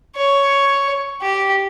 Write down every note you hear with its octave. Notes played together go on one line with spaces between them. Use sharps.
C#5
G4